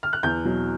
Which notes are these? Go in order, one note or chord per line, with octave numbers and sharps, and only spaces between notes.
F6
F#6
E2 G6
B2 F#3